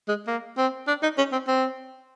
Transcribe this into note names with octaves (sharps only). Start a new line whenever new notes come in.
G#3
A#3
C4
D4
D#4
C#4
C4
C4